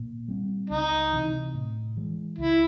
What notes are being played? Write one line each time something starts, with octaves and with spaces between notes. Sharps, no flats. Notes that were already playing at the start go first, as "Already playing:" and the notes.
Already playing: A#2
G3 C4
C#2 D#4
C3 E3
A2
E3 G#3
C#2 E4